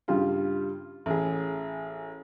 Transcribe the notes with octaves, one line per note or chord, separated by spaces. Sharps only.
G2 C#3 G3 F4
A1 G#4